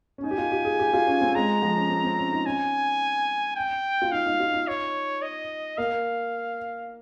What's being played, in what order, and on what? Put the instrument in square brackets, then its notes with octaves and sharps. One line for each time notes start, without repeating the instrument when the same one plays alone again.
[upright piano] C#4
[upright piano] D#4 [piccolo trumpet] G#5
[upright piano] G4
F4
G4
G#4
G4
F4
C#4
C4
[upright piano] G#3 [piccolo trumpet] A#5
[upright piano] F3
C#4
C4
C4
C#4
D#4
[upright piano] C#4 [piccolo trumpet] G#5
[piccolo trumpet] G5
[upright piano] F4
[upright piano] D#4 [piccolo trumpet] F5
[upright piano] D#4
F4
D#4
[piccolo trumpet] C#5
D#5
[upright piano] A#3 [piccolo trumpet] F5